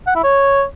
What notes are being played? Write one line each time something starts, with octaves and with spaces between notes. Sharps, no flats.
F#5
E4
C#5